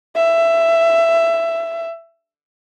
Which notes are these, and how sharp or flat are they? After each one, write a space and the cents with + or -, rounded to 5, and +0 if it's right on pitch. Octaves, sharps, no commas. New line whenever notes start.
E5 +15